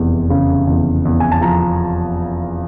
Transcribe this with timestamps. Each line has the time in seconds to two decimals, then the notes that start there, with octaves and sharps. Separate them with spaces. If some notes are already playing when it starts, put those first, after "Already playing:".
Already playing: F1 E2
0.30 C#3
0.67 E2
1.05 E2
1.20 G#5
1.32 A5
1.41 F3 A#5